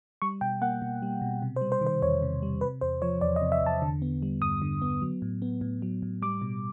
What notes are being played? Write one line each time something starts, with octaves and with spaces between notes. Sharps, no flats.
G3 C#6
B2 G5
A#3 F#5
B2
G3
B2
C3
C5
G3
C5
D#3
C5
E2 C#5
C3
G3
C3 B4
E2 C5
F3 C#5
E2 D5
D#5
C3
E5
E2 A5
D3
B3
G3
G2 D#6
D3
B3
F#3
A2
B3
A2
F#3
A2
G3 D6
B2